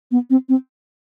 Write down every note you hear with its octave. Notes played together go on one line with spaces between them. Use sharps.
B3
C4
C4